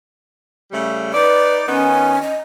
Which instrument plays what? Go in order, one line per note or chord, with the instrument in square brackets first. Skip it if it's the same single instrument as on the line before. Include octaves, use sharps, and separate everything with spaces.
[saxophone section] C#3 G3 A3
[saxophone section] D#4 D5 [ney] B4
[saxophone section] D#3 B3 D#4 [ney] C#4
[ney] D#5